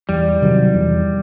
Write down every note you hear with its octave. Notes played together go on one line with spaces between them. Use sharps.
E2 G3
C3 D#3 F#3
E2